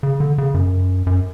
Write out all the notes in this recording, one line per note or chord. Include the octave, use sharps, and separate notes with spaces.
C#3
D3
C#3
F#2
F#2